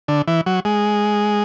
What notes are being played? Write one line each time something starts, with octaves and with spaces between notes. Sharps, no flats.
D3
E3
F#3
G#3